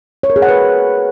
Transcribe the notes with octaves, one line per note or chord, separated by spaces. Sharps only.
C#5
A#4
G#4
F#5
B4